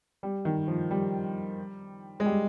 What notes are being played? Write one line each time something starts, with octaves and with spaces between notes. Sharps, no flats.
G3
D#3
F3
G3
G#3
G3